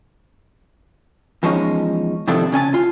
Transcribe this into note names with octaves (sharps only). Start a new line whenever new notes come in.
E2 F3 G#3 C#4 D#4
C3 D#3 F3 C4 D4 A4
C#3 C#4 G#5 A5
F4